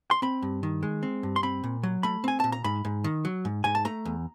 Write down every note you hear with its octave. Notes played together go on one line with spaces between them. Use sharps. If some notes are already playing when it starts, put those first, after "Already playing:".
C6
C4 B5
G2
D#3
G#3
C4
G2
C6
C4 B5
A#2
F#3
A3 B5
C4 G#5
A#2 A5
A#5
G#2 B5
G#2
D#3
F#3
G#2
G#2 G#5
A5
A3 A#5
E2